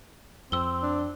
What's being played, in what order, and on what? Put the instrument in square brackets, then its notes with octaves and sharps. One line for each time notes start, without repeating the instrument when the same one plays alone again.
[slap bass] F2 [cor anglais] C4 [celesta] E6 G7
[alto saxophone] D4